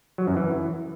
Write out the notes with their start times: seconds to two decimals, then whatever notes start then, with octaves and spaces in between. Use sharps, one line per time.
0.18 F#3
0.27 F#2
0.36 E3